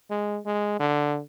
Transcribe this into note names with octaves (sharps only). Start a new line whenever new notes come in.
G#3
G#3
D3